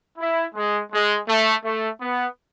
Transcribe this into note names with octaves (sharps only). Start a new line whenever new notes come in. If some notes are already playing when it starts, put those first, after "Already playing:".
E4
G#3
G#3
A3
A3
B3